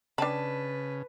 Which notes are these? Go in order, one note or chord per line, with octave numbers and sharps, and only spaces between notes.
C#3 D4 B4 A5 B5